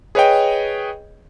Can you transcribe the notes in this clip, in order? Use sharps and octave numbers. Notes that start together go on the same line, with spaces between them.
G#4 B4 C#5 D#5 G5